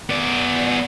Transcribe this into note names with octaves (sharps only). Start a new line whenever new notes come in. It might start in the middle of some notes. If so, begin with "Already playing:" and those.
B3 D5